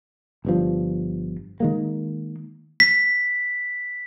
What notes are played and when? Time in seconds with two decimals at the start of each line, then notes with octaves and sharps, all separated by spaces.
0.45 G1 G2 F3
1.60 D#3 G#3 A#3
2.80 B6